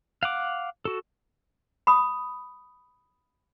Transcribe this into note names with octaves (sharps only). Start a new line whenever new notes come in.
F5 F#5 D6
F#4 A4
B5 D#6